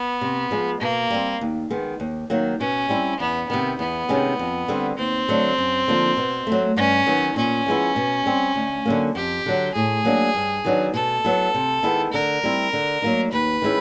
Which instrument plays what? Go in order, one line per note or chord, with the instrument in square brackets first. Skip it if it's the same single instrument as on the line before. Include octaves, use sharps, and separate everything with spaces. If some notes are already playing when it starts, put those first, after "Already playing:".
Already playing: [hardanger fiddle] B3
[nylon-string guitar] C3
F3 G#3
[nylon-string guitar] B2 [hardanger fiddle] A#3
[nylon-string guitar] G3 C4
D#2
D#3 G#3 B3
D#2
D#3 F#3 A#3
[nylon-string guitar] B2 [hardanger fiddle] C#4
[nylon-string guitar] G3 C4 E4
[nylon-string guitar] E2 [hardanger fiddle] B3
[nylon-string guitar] C3 D#3 [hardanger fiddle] B3
[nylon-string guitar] E2 [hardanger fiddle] B3
[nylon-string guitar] C3 D#3 G#3 C#4
F2
D3 G3 C4
[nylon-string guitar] D#2 [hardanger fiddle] C4
[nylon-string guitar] D3 F#3 A3 D4
F#2
D3 F3 A#3 D#4
B2
A3
F#3
[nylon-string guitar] G2 [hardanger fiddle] C#4
[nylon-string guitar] D#3 F#3 B3
[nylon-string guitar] A#2 [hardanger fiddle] C#4
[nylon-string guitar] F3 G#3 B3 E4
B2
G3 C4
D2
D3 F#3 A#3
[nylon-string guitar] F2 [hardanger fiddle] G4
[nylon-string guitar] D3 F#3
[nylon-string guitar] A2 [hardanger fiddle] G#4
[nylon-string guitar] F#3 A#3 D4
G2
D#3 F#3 B3 D4
[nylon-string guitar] B2 [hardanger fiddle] A4
[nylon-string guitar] F#3 B3 E4
C3
D#3 G#3 B3 E4
[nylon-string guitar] D3 [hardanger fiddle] A#4
[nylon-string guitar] G3 C4 E4
D3
F#3 A#3 D#4
[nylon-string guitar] D#2 [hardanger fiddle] B4
[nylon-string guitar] D#3 G#3 C#4 E4